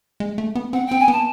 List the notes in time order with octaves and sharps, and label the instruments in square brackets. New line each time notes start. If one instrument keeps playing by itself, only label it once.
[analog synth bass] G#3
A3
B3
[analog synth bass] C4 [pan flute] F#5
[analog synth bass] C4 [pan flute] G5
[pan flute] G#5
[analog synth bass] B3 [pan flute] A5